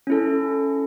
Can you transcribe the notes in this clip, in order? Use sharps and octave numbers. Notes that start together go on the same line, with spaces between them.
C#4 E4 A4